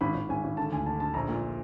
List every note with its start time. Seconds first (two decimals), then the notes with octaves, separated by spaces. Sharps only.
0.01 G#1 B5
0.15 G#1
0.29 G#1 G#5
0.44 G#1
0.57 D3 A5
0.72 D2 G#5
0.86 D3 A5
1.00 D3 A5
1.14 A#1 A#5
1.29 A#2